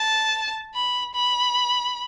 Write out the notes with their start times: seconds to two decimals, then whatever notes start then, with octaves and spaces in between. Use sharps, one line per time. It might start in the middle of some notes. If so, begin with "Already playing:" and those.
Already playing: A5
0.75 B5
1.15 B5